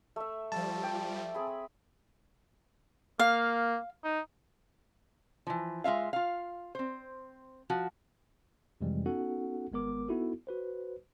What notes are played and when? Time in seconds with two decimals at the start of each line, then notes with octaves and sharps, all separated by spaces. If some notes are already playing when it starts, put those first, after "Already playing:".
0.16 A3 E5
0.52 F3 G3 A5
0.83 G5 D6
1.34 C4 G#4 B5
3.19 A#3 F5
4.04 D#4
5.47 E3 F3
5.84 G#3 F4 E5 F5
6.13 F4 F5
6.75 C4 C5
7.70 F3 F#4
8.81 F2 C3 E3 G3 G#3
9.06 B3 C#4 D#4 F#4 A4 F#5
9.72 G#1 G#3 B3 A#4 D6
10.09 B3 D#4 E4 F#4 A4
10.47 F#4 B4 C5